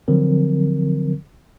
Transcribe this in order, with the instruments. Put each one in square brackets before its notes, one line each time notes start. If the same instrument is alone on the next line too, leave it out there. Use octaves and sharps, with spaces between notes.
[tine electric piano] D3 F3 F#3 C4 A#4